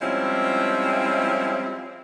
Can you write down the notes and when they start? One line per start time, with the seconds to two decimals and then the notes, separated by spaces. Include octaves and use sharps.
0.02 F3 G3 G#3 C4 C#4 E4